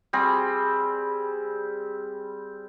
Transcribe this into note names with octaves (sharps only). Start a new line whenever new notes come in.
G3 C4 G#4